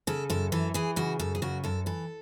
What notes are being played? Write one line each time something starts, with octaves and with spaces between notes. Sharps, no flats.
C#3 A4
F#2 A4
E3 A4
E3 G#4
C#3 F#4
F#2 A4
G#4
C#3 F#4
F#2 A4
E3 A4